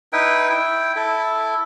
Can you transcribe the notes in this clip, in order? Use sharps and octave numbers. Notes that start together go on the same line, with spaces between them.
D#4 E4 B4 G5
E4 G5
E4 A4